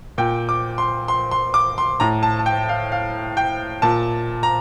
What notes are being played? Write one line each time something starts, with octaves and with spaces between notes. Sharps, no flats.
A#2 G5
D6
C6
C6
C6
D6
C6
A2 A#5
A5
A5
G5
F5
F5
G5
A#2 A5
A#5